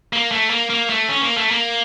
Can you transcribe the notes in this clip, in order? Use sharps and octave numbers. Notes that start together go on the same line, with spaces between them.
A#3
A3
A#3
A#3
A3
C#4
A#3
A3
A#3